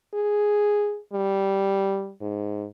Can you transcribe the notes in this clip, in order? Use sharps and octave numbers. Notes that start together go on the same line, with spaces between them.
G#4
G3
G#2